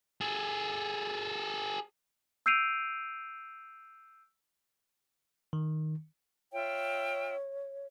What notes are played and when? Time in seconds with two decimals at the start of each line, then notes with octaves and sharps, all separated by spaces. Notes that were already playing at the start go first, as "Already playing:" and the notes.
0.21 G#4 A4
2.46 E6 G6 C7 D7 D#7 F7
5.53 D#3
6.53 F4 C#5 E5 G5